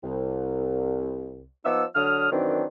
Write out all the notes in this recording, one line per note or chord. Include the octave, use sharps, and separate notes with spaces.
C2
F3 B3 D#4 D6 E6
D3 F#3 D4 D#6 F6
F#2 D#3 E3 F#3 C4 D4